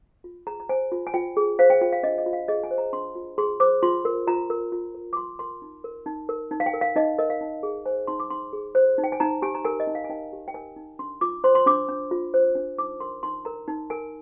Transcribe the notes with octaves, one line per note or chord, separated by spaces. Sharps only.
F4
G#4 A#5
A#5
C5 G#5
F4
G#5
F4 G5
G#4
C5 F5
G5
F4 G5
F5
D4 D#5
D#5
F4
F5
G#4 D#5
G#5
C5
A#5
D4 C6
F4
G#4 C6
C5 D6
F4 C6
A#4
F4 A#5
A#4
F4
A#4
D6
F4 C6
A#4 C6
D#4
A#4
D#4
A#4
D#4
F5
G5
A#4
F5
D#4 D#5
A#4 D#5
F5
D#4
G#4
C5 G#5
D#4 C6
D6
D#4 C6
G#4
C5
D#4
G5
G#5
D#4 A#5
G4 G#5
A#5
A#4 G#5
D#5
D#4
F5
G#5
D#4 G5
G4
G5
A#4 G#5
D#4
D4 C6
F4 D6
C5 C6
C6
D4 D6
D4
F4
C5
D4
D#4 D6
A#4 C6
D#4 C6
A#4 A#5
D#4
A#4 G#5